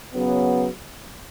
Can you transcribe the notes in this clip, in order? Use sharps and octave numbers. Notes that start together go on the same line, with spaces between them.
C#3 F#3 B3